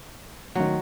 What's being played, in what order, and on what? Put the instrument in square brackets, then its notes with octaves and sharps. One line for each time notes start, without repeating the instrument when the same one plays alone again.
[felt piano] D2 D#3 [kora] F#3